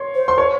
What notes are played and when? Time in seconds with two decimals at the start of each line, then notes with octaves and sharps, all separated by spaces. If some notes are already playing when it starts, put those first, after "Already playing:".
Already playing: C#5 C6
0.15 C5
0.28 C6
0.38 C#5 C#6